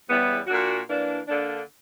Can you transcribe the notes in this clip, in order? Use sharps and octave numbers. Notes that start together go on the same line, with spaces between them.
E2 C#3 G3 B3 E4
A#2 A#3 D4 F#4
E3 A#3 D4
D3 A#3 D4